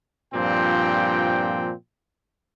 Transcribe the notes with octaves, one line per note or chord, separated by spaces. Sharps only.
G2 A#2 F3 C4 G5